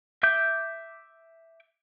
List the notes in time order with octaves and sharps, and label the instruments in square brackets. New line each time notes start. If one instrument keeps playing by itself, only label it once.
[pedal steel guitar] E5 D6 G6